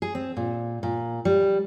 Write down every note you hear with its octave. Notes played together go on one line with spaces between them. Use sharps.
G#4
C4
A#2
A#2
G3